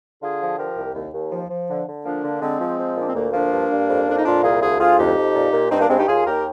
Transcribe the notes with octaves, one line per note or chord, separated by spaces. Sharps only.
D3 F4 G#4
F3
F3 G4 A#4
C2
D#2
D#2
F3
F3
D3
D3
F3 A#3 D4
D3
D3 G#3 C4
F3
F3
A#2 D4
C4
D2 A#3
F3 A#3 D4
G2
G2
F2
F2 D4
D#4
A#2 D4 F4
C2 F4 G#4
D2 F4 G#4
D2 F4 G#4
F2 D#4 G4
F2
A#2
A#2
G2 C4 D#4
A#3 D4
G2 G#3 C4
D#4 G4
D#2 F4 G#4
D#2 G4 A#4